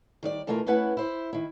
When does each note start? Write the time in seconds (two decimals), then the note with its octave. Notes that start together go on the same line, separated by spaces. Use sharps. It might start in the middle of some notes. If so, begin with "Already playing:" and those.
0.23 D#3 G3 D5
0.47 B2 E3 A3 F4 A#4
0.66 A3 B3 C#4 E4 B4 F#5
0.97 E4 C5
1.33 D#3 E4